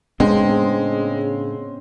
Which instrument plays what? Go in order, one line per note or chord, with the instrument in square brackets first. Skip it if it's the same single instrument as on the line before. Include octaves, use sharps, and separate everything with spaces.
[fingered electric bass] A2 B3 D4 [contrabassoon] C#3 [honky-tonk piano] G#3 [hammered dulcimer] C4